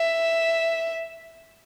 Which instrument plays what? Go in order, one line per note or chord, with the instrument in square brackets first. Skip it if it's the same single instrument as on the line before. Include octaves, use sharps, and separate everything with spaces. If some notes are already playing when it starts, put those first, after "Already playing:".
Already playing: [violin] E5